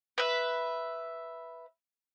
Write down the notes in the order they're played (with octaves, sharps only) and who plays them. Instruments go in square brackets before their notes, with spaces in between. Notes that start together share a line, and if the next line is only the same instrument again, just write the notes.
[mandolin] B4 E5